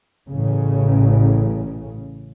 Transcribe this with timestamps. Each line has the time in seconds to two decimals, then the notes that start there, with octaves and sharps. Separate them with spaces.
0.29 A1 C#3